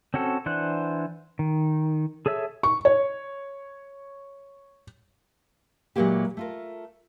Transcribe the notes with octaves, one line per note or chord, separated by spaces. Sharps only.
C4 C#4 F#4 A4
E3 D4 C5 F#5 F#6
D#3
G#4 A4 C#5 E5 E6
C#6
C#5
A#2 E3 F#3 G#3 A#3 G4
A3 F4 A#4